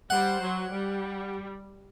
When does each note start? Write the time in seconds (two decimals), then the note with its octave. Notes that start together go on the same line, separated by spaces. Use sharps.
0.10 G3 C5 F#5
0.42 F#3
0.71 G3